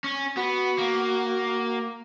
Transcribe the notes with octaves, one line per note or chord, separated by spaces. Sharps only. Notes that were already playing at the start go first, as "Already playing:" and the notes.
C#4
B3 F#4
A#3